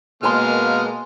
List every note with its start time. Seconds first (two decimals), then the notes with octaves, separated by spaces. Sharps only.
0.23 B2 G#3 A#3 G#5 A5 C6 F6